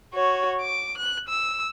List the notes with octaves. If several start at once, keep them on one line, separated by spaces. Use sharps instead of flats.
F#4 C#5
D6
F#6
E6